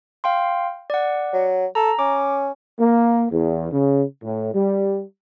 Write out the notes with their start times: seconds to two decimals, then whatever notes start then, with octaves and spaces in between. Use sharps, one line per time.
0.24 F5 G5 C6
0.90 D5 F#5
1.33 F#3
1.75 A4 A#5
1.99 C#4 D6
2.79 A#3
3.31 E2
3.72 C#3
4.23 A2
4.54 G3